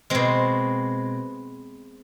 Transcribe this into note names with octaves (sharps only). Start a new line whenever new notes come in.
B2 G#3 C4